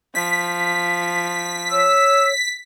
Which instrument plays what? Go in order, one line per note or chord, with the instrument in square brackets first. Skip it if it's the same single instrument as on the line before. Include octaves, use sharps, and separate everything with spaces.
[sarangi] F3 [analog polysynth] B6
[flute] C#5 [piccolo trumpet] E6